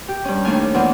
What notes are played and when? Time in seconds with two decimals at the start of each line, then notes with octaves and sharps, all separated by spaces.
0.08 G4
0.25 G2 C#4
0.44 D#2 A3 D4 G#5 F6
0.74 E2 A#2